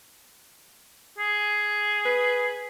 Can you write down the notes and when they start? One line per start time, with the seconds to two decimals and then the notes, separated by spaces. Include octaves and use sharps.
1.18 G#4
2.05 B4